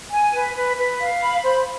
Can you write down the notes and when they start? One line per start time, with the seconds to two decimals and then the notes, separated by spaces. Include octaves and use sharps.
0.10 G#5
0.34 B4
0.54 B4
0.77 B4
1.00 F5
1.21 B5
1.44 C5